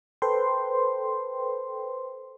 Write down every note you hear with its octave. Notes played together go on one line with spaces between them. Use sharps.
A4 B4 C5 G5 C6